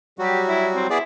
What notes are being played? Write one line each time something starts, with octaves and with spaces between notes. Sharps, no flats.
F#3 G3 F#4 G4
E4
C4
B3 E4 G#4 D5